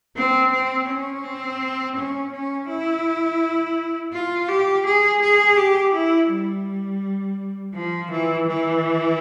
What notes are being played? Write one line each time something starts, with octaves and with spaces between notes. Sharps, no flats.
C4
C4
C#4
C4
C#4
C#4
E4
F4
G4
G#4
G#4
G4
E4
G3
F3
E3
E3